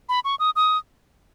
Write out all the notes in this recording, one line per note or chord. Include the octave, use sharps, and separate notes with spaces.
B5
C#6
D#6
D#6